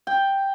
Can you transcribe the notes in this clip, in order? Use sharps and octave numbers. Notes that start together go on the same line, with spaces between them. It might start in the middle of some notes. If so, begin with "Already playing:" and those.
G5